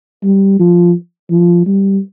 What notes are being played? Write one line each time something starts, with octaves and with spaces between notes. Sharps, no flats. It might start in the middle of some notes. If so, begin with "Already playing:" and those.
G3
F3
F3
G3